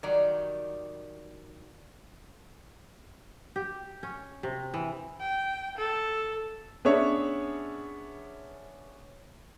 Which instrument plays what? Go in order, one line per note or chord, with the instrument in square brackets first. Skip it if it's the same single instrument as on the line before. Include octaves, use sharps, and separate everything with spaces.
[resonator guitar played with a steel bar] D#3 F#3 G3 D5
[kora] G4
C#4
C3
E3
[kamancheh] G5
A4
[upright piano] B3 C#4 D4 G#4 C#5 E5